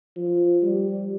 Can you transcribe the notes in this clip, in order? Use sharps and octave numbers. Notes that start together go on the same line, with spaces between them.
F3
G3